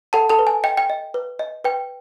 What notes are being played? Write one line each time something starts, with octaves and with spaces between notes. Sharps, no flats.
A4 F#5 A5
A4 A5
B4
G#5
D#5 G5
G5
D#5
B4
D#5
B4 G5